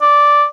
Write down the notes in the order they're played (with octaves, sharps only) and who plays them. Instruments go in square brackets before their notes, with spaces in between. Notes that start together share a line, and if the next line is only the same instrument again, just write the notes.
[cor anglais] D5